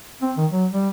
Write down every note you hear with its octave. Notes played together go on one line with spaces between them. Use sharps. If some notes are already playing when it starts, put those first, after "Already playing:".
C4
D#3
F#3
G3